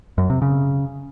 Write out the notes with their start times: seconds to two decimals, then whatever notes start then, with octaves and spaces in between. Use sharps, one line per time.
0.18 F#2
0.30 C3
0.42 C#3